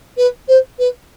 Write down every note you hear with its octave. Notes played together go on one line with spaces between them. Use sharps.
B4
C5
B4